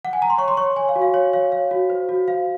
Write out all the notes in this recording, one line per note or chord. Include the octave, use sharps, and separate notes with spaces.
F#5
G#5
A#5
C6
C#5 C#6
C6
C#5 C#6
C#5 G#5
F5
F#4
F5
C#5
C#5 F5
C#5 F5
F#4
C5
F#4
C5 F5